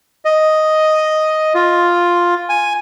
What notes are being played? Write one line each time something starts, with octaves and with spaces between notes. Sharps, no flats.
D#5
F4
G#5